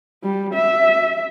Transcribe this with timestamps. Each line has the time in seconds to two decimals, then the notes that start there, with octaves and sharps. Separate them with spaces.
0.24 G3
0.54 E5